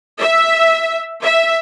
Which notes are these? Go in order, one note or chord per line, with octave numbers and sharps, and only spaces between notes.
E5
E5